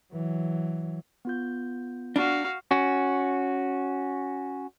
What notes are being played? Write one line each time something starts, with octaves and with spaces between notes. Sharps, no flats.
E3 F#3
B3 F4 G6
D4 F#4 F5
C#4 F#4